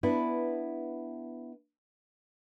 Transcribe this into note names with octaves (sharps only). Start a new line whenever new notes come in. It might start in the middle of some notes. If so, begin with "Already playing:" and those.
B3 D4 E4